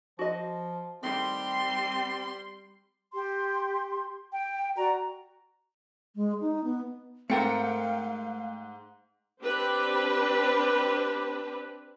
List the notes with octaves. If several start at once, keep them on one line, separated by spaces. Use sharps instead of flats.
F3 F#4 D#5
D#3 G3 A3 C4 G4 C6
G4 C6
G5
F#4 D5 A#5
G#3
D#4
B3
G#2 A3 C4 A4 A#4 F5 G5 C#7
C4 D4 G4 B4